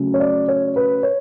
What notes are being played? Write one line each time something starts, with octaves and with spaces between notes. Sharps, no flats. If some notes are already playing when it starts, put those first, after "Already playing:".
Already playing: C#3 F#3 A3
C#5
D5
C#5
B4
C#5